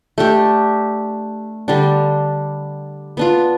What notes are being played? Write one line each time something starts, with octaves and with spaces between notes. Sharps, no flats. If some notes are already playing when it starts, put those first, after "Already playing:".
A3 D4 G4
D3 G3 D4
B3 D4 F4